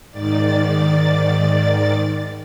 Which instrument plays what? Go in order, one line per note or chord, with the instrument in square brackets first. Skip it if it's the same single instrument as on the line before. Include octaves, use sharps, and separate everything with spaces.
[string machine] G#2 D#3 D5 A6